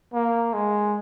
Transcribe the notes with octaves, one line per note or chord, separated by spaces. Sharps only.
A#3
G#3